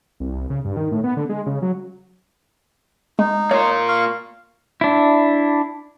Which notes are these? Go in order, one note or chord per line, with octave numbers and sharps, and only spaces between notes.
C2
C2
C#3
G2
D#3
A2
B3
D3
G#3
C#3
F#3
G#3 D#4
A#3 F4 C#5
F5 C#6
D4 E4